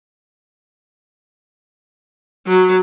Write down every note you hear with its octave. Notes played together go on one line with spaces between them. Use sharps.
F#3